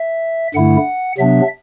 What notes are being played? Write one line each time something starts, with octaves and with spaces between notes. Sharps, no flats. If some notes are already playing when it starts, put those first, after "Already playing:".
Already playing: E5
G2 D3 A3 E4 F#5
C3 F#3 B3 D4 E5